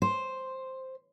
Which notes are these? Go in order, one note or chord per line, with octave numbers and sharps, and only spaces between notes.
C5